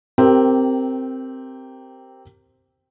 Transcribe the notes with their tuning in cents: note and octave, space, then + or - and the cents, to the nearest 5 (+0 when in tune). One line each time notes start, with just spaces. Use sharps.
C4 +0 G4 -20 A#4 -15